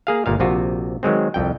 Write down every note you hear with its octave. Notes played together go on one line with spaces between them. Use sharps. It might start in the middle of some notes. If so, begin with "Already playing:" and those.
A#3 G#4 F5
G1 A#2 F5
A#1 C3 F4 F#4
D#3 F#3 G#3 C4
C2 F2 G5